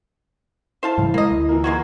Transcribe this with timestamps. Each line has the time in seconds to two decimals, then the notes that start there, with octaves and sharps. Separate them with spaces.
0.83 E4 C5 F5 A5
0.98 G#2 C#3 E3
1.14 G#3 A#3 D#5
1.31 D2
1.49 E3 A#3
1.64 E3 G#3 A#3 F4 F#4 G#6